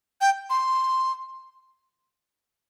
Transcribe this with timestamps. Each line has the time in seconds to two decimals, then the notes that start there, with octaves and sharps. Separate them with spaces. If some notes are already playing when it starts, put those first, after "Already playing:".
0.21 G5
0.50 C6